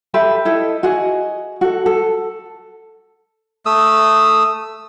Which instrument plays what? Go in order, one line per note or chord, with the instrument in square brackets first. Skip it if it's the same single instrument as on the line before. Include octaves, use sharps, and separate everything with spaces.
[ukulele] G4 A4 B4 E5
E4 A4 D#5
F#4 G#4 D#5
F#4 A4
A4
[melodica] A3 D#6 E6